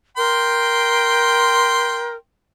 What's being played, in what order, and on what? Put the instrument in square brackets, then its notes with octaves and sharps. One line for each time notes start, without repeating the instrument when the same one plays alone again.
[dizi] A#4 [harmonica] G5 C6